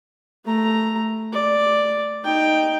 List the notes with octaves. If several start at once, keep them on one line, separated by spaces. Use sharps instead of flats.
A3 A#5
D5
D#4 G5